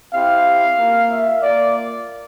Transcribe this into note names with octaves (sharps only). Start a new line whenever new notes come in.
C4 E4 G4 F5
A#3 F4
E5
A#3 F4 D5